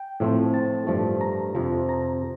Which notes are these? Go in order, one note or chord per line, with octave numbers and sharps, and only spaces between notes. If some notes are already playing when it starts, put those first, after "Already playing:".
Already playing: G5
A2 F3 A3 C4
A5
G2 F3 A3
A#5
F2 C3 F3
A#5